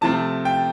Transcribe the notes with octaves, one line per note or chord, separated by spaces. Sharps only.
C3 F3 A3 C4 A5
G5